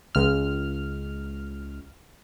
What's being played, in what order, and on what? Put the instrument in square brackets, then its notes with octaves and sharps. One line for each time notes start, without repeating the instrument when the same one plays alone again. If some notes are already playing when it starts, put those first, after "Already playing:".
[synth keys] C#2 F6